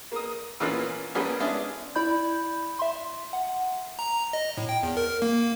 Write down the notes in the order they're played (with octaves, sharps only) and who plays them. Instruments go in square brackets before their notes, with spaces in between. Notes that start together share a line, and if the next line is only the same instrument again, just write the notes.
[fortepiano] A#3 D#6
A#2 E3 A#3 B3 C#4 F4
A#1 G3 A#3 C#4 B4 G#5
G#3 B3 C#4 D4 E4 G#4
[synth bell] E4 D5 B5 G6
E5 C6
F#5
[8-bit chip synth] A#5
D#5
A2
G5
E2
A#4
A#3